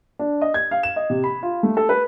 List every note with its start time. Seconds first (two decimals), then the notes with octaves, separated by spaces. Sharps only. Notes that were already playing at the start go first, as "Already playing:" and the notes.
0.19 D4
0.42 D#5
0.54 G#6
0.71 F5
0.83 E7
0.96 D#5
1.10 C3
1.24 B5
1.43 F4
1.63 A3
1.77 A4
1.89 B4